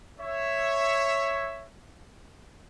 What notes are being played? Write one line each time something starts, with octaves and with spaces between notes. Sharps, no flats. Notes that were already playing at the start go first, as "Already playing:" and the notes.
C#5 E5